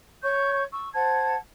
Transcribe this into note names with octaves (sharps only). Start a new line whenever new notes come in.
C#5 C#6 G6
C#6 E6
C5 F#5 A5 G#6